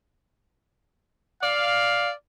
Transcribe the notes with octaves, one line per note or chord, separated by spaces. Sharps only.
D5 F5